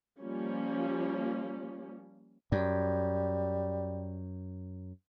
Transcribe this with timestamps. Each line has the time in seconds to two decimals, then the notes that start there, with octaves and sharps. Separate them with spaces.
0.22 F3 G3 A#3 C#4
2.52 F#2 G3